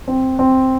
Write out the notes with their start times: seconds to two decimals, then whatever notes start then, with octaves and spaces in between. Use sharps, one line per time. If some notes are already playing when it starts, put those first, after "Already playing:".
0.08 C4
0.39 C4